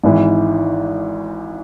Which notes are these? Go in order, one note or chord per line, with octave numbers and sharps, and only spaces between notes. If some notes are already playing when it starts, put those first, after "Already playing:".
G#1 G#2 E3